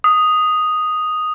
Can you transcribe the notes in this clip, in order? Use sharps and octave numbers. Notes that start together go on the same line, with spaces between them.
D#6